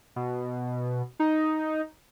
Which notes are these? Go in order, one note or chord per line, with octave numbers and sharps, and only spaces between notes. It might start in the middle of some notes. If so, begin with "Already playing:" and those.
B2
D#4